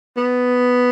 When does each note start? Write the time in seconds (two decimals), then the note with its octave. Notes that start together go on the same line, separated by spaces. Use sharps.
0.17 B3